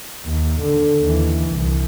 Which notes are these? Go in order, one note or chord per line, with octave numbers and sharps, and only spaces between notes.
D#2
D3
D#2 E3
C2